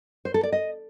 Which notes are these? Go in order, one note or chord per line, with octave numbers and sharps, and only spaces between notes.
C5
A4
D5
D#5